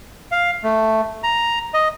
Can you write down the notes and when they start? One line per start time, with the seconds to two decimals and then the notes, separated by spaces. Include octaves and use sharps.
0.32 F5
0.63 A3
1.23 A#5
1.74 D#5